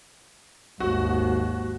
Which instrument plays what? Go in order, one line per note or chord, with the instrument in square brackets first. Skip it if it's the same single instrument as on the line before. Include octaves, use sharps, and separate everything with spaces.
[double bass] G#1 D#2 [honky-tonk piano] F#4